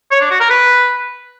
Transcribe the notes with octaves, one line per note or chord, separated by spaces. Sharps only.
C#5
D4
F#4
A#4
B4